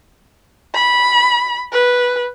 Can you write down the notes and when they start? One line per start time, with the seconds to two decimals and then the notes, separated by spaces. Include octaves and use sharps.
0.75 B5
1.73 B4